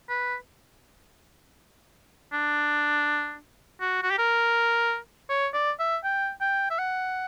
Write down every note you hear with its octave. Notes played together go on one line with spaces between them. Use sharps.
B4
D4
F#4
F#4
G4
A#4
C#5
D5
E5
G5
G5
E5
F#5